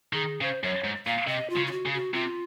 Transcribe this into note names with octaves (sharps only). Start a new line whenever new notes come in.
D#3 G#4
C#3 C5
F#2 C#5
G#2
A#2 F5
C3 D#5
F4
C#3
F4
F#4
C#3
F#4
C3 F4